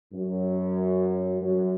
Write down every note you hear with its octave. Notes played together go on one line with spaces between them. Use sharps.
F#2
F#2